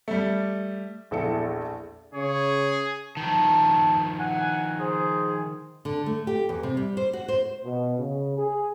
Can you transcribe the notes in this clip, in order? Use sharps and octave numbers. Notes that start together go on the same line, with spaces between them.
G3 A3
A#1 E2 A4 E5 A5 C#7
C#3 G#4 C#5
D#3 F3 A5
F#5 G#5
G#4 C5
D3
A3
G4
E2
C3
G3
C5
F#4
C5
B2
C#3
G#4